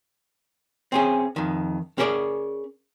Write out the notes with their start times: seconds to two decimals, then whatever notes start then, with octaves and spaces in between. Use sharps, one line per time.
0.92 C4 C#4 G#4
1.36 F2 D#3
1.98 C#4 G#4 A#4 C#5 D5